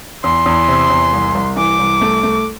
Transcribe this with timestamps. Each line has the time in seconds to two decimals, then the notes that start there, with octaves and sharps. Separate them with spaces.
0.24 E2 C6
0.46 E2
0.68 C3
0.90 E2
1.13 C2
1.35 C2
1.57 E3 D6
1.79 C2
2.01 A3
2.23 A3